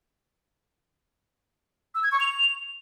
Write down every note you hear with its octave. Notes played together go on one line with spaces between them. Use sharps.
E6
G#6
C#6
F7